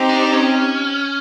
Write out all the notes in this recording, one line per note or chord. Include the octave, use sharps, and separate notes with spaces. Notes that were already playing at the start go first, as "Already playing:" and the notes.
Already playing: C4 D#4 G4
D4
C#4